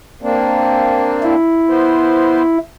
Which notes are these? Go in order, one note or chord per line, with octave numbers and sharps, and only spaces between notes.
A#3 C4 D4
E4
B3 C5